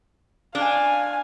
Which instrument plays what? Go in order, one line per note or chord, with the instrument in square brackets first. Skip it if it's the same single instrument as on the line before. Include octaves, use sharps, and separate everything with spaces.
[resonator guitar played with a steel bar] D4 [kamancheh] F5 G#5